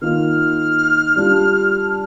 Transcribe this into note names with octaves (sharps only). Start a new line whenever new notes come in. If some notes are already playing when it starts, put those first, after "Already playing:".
D#3 A#3 F4 F6
G3 D4 F4